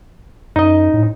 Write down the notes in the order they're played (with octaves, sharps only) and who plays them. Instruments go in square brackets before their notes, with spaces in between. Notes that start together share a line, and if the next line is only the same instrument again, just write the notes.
[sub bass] F#2 [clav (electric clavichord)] D#4 D#5
[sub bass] A2